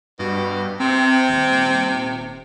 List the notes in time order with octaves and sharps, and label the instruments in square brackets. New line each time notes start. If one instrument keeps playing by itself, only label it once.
[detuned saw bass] G2 [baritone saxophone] B2
[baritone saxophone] C3 [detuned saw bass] C4
[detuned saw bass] D#1